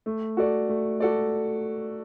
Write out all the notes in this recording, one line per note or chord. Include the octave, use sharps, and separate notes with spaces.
A3
F#4 A4 D5
A3
F#4 A4 D5